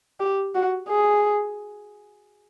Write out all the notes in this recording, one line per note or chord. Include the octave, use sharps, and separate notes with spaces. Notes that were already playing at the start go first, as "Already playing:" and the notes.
G4
F#4
G#4